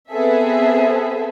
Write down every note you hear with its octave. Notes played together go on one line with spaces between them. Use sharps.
B3 C4 G#4 A4 E5